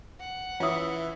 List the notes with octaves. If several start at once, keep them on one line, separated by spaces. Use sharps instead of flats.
F#5
E3 C#4 F4 E5 D#6